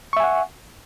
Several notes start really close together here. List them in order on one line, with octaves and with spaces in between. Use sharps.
C#6 E5 G#5 F#5